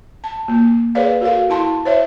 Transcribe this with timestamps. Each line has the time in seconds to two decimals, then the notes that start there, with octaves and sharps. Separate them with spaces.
0.24 A5
0.48 A#3
0.95 G#4 A#4 B4 C#5 D5 F5
1.21 F#4 A4 A#4 F5
1.50 E4 A5 C6
1.85 C5 C#5 E5